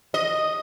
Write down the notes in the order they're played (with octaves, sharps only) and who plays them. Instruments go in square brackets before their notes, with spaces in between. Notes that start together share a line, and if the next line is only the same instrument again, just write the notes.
[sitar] D#5